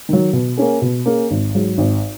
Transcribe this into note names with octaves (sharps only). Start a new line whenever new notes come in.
D#3 F#3
B2
A#3 C#4 G#4
B2
A#3 C#4 G#4
G#1
G#2 F#3
G#1